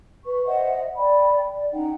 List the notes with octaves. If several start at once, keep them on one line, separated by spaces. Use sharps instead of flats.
B4 C#6
C5 D#5 E5 F#5
D5 G5 B5
D5
C#4 D#4 F#5 G5